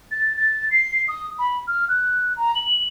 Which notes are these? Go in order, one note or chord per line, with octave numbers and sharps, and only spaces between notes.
A6
A6
C7
D#6
B5
F6
F#6
A#5
F#7